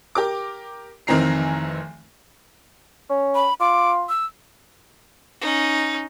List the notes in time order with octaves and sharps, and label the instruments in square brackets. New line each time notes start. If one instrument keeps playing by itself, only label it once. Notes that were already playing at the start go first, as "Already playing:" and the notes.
[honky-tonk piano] G4 A#4 D6
F1 D#3 E3 C4 A#5 C7
[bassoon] C#4
[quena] B5
[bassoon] F4 [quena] D6
[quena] E6
[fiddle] C#4 D#4